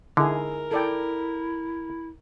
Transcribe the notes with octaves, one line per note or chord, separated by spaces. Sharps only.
D3 D#4 E4 G#4 A#4
E4 A4 D5 G5